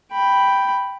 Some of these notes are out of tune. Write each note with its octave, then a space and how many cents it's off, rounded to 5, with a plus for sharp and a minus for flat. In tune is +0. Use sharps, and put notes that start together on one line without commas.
G5 +0 B5 +0